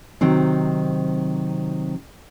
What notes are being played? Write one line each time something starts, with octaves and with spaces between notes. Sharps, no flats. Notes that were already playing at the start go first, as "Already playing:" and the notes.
C3 D#3 F#3 C4